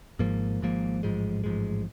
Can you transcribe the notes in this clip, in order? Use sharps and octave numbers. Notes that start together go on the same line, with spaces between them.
G#1 G#2 F3 A#3
G#1 G#2 F3 A#3
A1 G#2 F3 G#3
A1 G#2 F3 G#3